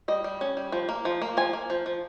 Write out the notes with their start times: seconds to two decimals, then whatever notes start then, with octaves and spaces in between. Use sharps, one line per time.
0.08 G3 D#5
0.24 G3
0.41 C#4
0.57 G3
0.72 F3
0.89 A#3
1.05 F3
1.22 A#3
1.37 F3 G#5
1.53 A#3
1.70 F3
1.86 F3